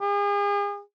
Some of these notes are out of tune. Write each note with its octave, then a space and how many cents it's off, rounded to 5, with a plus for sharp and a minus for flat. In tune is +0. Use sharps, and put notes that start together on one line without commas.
G#4 -40